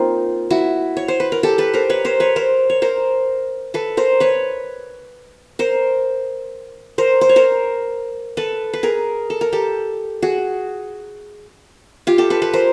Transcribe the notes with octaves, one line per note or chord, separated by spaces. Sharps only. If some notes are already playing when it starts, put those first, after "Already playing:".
Already playing: A#3 C4 D#4 F4
E4 F#4
C#5
C5
B4
A#4
G4 A4
A4 B4
A#4 C5
B4 C#5
A#4 C5
B4 C#5
A#4 C5
C#5
A#4 C5
A4 B4
A#4 C5
B4 C#5
A#4 C5
A#4 C5
C5
C#5
A#4 C5
A4 B4
B4
G#4 A#4
A4
A#4
G4 A4
F#4 G#4
F4 G4
G4 A4
A4 B4
A4 B4
A#4 C5